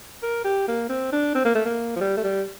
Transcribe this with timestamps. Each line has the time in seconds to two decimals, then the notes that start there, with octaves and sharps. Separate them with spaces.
0.23 A#4
0.44 G4
0.68 A#3
0.89 C4
1.12 D4
1.35 C4
1.45 A#3
1.55 A3
1.65 A#3
1.96 F3
2.01 G3
2.17 A3
2.24 G3